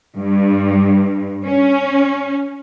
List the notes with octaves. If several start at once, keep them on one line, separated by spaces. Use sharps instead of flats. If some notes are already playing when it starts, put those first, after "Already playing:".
G2
C#4